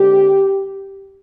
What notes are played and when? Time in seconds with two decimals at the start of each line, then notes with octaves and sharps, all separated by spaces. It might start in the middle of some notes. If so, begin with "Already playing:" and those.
Already playing: D3 G#3 C4 G4